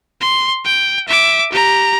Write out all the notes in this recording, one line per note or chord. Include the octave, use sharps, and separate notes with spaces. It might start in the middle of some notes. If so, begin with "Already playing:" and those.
C6
G5
E5 D6
G4 A#5